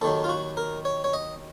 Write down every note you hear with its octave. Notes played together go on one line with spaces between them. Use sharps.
D#2 D#3 F#3 A4
F4
F#4
A#4
C#5
C#5
D#5